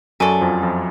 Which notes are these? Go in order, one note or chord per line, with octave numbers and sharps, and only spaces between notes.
F#2 F#3 A4 D5 G#5 C#6
F2 F3
F2 F3